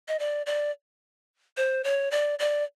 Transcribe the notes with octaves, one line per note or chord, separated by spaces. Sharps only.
D#5
D5
D5
C5
C#5
D5
D5